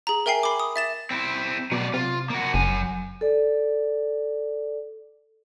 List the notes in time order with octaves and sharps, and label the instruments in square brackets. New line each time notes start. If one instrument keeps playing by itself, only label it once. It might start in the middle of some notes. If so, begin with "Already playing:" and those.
[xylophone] G#4 A#5
A#4 E5 G5 G#5 C7
B5 D6
D#6
E5 A6 E7
[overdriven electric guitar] C4 E4
[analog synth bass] B2 [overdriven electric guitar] F#3 D5
[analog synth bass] C3 [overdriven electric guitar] F4
[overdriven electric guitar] A#3 F#4
[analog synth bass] F#1 [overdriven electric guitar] F#3 G#5
[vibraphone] A4 D5